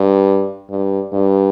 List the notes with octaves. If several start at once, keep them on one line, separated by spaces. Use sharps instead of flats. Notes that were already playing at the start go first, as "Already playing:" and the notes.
Already playing: G2
G2
G2